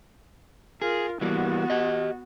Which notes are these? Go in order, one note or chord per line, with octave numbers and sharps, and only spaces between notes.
F4 G#4 A#4
E3 G3 A#3 B3 F#4
G4 D#5